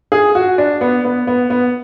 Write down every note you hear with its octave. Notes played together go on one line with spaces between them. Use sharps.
G#4
F#4
D4
B3
B3
B3
B3